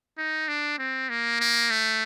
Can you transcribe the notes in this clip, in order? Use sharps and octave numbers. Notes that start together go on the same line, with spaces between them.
D#4
D4
C4
A#3
A#3
A3